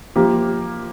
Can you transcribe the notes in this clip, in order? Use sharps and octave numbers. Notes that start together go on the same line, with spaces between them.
F3 A#3 G4